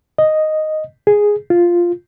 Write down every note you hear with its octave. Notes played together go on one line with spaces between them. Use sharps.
D#5
G#4
F4